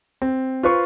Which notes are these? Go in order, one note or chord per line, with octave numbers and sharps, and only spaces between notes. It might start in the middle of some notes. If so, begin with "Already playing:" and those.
C4
F4 B4 C5 C#6